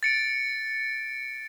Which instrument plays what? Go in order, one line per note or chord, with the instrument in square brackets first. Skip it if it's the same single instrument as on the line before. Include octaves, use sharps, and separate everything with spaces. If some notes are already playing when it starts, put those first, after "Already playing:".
[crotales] A6 C#7 D7